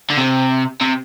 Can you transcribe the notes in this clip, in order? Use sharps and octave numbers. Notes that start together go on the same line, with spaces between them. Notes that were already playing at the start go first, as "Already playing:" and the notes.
D3
C3
C3